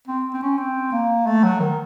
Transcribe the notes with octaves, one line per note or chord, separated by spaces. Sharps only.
C4
C4
C#4
C4
A#3
A3
F#3
D#3